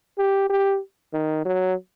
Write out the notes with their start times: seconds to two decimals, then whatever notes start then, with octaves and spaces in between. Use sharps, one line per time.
0.18 G4
0.50 G4
1.14 D#3
1.45 F#3